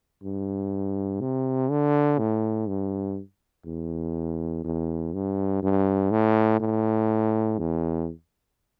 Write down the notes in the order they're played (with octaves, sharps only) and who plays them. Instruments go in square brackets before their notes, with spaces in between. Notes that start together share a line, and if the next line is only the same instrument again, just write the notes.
[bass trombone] G2
C3
D3
A2
G2
E2
E2
G2
G2
A2
A2
E2